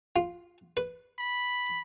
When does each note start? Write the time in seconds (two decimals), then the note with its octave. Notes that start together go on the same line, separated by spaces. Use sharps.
0.16 F4
0.77 B4
1.19 B5